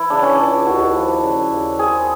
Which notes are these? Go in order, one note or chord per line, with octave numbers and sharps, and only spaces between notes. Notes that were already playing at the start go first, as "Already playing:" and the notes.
Already playing: E3 E4
C#3 D4
C#4
C#2 D4
D#2 F#4
F3
C#3
D#2
C4 G#4